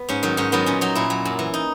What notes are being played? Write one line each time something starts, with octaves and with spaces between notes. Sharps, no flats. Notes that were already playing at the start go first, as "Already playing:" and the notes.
Already playing: B3
G#2 C#4
D#3 F#3
G#2 C#4
D#3 F#3 B3
A#2 C#4
F#3 D#4
A#2 E4
F#3
F#2
E3
D#4